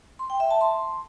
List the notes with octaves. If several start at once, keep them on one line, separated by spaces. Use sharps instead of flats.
C6
G5
E5
A5
C6